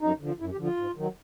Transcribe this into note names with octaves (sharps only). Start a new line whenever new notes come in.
F#2 D#4
D3 F3
F#2 E4
G4
D3 F3
F4
G#2
D#3 F#3